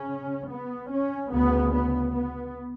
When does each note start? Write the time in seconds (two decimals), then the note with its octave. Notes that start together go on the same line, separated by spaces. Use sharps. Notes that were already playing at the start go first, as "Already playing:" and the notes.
Already playing: C#3 C#4
0.49 B3
0.91 C#4
1.32 D2 C#3 B3
1.74 B3
2.14 B3